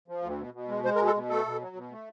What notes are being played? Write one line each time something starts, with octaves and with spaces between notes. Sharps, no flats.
F3
D2
B2
B2
G#3
G#3 C5
A#4
B2
A4
B2
A3 A4
B2
F#3
B2
A3